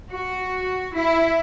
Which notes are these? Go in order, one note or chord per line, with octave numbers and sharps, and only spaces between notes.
F#4
E4